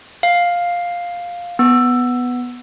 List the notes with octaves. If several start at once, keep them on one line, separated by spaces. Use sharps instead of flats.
F5
B3